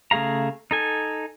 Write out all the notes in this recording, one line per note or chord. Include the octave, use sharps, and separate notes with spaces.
C#3 A3 G#4 F5 A#5
D#4 A4 G#5